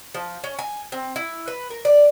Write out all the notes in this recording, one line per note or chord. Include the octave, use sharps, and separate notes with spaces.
F3
C#4
G#5
C4
E4
B4
A#4
D5